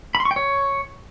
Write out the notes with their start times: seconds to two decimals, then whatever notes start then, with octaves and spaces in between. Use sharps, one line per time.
0.15 B5
0.20 C6
0.25 C#6
0.31 G5
0.36 C#5